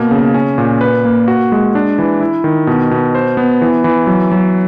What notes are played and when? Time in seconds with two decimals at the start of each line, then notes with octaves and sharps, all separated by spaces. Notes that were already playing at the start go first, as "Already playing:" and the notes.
Already playing: B2 A#3
0.11 C#3
0.34 C#4
0.58 A#2
0.81 B4
1.05 A#3
1.28 F#4
1.52 G#3
1.75 D4
1.98 E3
2.21 E4
2.44 D#3
2.67 B2
2.91 B2
3.15 C5
3.37 B3
3.62 E3
3.84 E3
4.07 F#3
4.31 F#3